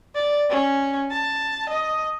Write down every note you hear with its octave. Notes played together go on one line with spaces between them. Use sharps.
D5
C#4
A5
D#5